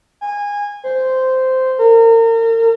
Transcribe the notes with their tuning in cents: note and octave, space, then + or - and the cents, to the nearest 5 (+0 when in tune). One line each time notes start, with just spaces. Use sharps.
G#5 -20
C5 -10
A#4 -35